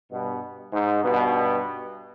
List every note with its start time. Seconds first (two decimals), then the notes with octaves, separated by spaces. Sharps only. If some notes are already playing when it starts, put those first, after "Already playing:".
0.11 G2 B2
0.73 G#2
1.04 G2 B2